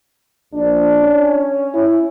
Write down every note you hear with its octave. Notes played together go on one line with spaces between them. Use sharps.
A#1 D4
C#4
E4